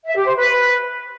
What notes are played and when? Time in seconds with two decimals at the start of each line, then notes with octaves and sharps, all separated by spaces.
0.06 E5
0.16 G4
0.26 C5
0.36 B4